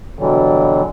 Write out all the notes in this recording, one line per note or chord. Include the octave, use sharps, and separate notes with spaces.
B2 D3 E3 F#3 G3